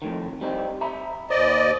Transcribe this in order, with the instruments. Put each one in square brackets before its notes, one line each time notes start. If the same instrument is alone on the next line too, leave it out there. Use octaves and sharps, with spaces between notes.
[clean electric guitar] F2 A2 D#3
G3 C4 D#4
E5 A#5 B5
[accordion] D#2 D5 D#5 [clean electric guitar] C5